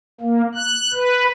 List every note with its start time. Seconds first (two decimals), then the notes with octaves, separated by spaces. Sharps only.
0.21 A#3
0.55 F#6
0.93 B4